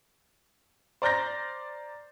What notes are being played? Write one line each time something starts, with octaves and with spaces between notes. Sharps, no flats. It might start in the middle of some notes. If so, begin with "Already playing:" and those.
C5 D5 A#5 F6 G6 A#6